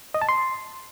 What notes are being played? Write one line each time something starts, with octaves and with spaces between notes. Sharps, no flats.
D#5
A5
C6